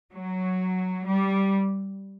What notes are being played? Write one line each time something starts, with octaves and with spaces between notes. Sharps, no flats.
F#3
G3